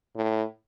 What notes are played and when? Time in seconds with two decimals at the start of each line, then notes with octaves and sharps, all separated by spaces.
0.16 A2